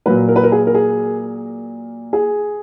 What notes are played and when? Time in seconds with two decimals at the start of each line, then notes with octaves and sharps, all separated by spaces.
0.06 A#2 F#3 A#3 B4
0.29 A#4
0.36 B4
0.43 A#4
0.52 G#4
0.67 A#4
0.75 G#4
2.13 G#4